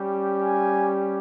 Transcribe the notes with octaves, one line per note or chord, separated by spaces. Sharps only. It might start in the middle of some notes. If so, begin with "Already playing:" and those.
Already playing: G3 C#4 G4
G#5